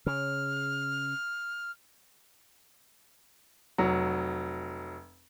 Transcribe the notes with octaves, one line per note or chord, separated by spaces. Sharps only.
C#3 F6
F1 F#3 A#5